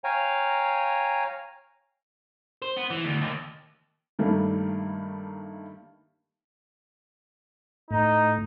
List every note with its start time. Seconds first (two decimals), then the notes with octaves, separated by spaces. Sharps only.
0.04 C#5 F5 G5 G#5 A#5
2.62 C5
2.77 B3
2.90 E3
3.04 D2
3.21 D#2
4.19 G2 D#3 G3 A3 A#3
7.91 A2 D#4